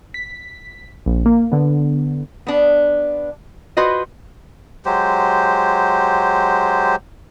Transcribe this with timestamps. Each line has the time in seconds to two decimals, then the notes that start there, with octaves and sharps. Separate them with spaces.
0.14 B6
1.06 A#1
1.26 A#3
1.52 D3 B3
2.47 B3 D4
3.77 F4 F#4 B4 C5 D#5
4.86 F#3 G#3 G4 C5